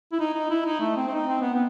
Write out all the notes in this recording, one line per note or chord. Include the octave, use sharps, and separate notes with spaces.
E4
D#4
D#4
E4
D#4
A3
C4
C4
D#4
C4
B3
B3